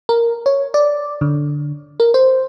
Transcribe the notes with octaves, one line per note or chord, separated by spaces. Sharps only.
A#4
C#5
D5
D3
A#4
C5